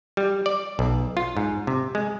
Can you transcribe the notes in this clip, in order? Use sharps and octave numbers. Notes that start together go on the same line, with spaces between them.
G3
D5
B1
F4
G#2
C3
G#3